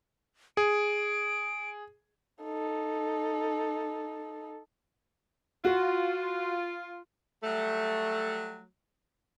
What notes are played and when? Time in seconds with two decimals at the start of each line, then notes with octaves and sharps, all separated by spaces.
0.57 G#4 D7
2.44 D#4 A4
5.65 F4 F#4
7.43 F#3 G3 A3